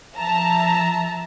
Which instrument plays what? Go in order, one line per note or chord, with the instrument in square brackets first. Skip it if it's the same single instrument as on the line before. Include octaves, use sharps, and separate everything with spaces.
[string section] F3 E5 A5 A#5